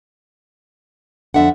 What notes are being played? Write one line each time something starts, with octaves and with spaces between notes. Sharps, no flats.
F2 D3 E5 F#5